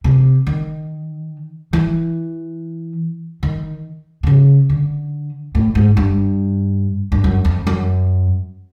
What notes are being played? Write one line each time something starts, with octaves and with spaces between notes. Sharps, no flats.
C3
D#3
E3
D#3
C3
C#3
D3
A2
G#2
G2
G2
F#2
F2
F#2